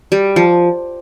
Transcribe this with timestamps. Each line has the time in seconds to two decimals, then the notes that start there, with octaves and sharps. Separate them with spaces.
0.12 G3
0.36 F3